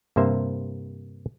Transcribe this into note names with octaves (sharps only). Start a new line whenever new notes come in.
G2 C3 A#3 C5 E5